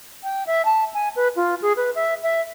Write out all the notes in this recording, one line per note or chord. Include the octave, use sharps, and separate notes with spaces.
G5
E5
A5
G#5
B4
F4
G#4
B4
E5
E5